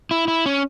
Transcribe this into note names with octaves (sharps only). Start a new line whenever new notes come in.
E4
E4
C#4